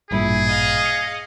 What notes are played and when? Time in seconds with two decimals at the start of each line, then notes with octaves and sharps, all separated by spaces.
0.11 A1 G2 A#2 E4 G#4
0.48 D#5 F5
0.86 A#6 C#7